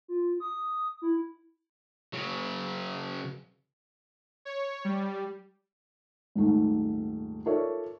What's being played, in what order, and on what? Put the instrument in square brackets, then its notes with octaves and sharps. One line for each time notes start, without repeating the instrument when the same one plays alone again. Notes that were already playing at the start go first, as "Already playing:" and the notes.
[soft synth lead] F4
D#6
E4
[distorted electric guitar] C#3 F#3
[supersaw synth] C#5
G3
[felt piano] D#1 G#2 A3
F4 A4 A#4 C#5 D5 E5